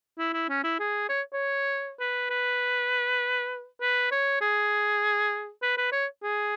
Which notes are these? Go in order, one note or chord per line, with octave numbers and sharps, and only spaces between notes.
E4
E4
C#4
E4
G#4
C#5
C#5
B4
B4
B4
C#5
G#4
B4
B4
C#5
G#4